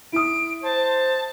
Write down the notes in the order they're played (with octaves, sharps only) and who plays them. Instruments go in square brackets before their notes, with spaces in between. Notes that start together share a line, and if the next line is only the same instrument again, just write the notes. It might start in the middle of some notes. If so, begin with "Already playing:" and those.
[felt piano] E4 D#6 [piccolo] D7
[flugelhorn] C5 [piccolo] A5